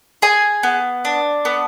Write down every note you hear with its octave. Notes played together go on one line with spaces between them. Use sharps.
G#4 G#5
B3
D4
B3